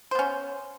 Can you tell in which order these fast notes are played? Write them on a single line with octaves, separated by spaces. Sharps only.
C5 B3 C#4